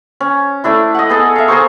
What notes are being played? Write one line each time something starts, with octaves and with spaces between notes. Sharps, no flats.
C#4
A3 D4 E4
D#5 F#5
B3 G#4 A4
E5 F5
G#4 A#4 C5 C#6